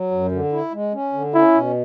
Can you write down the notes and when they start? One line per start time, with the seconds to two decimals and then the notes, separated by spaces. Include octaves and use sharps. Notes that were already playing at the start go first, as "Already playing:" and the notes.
Already playing: F#3
0.11 F#2
0.31 D3
0.52 E4
0.72 G#3
0.93 C#4
1.13 D3
1.34 C#4 E4
1.54 B2